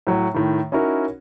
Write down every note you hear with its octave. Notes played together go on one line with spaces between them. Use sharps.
A2 F#3
A2 D#3
C#4 D#4 E4 F#4 A#4 C#5